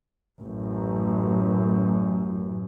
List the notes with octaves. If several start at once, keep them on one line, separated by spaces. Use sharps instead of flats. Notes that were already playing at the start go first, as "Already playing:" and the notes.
A1 F#2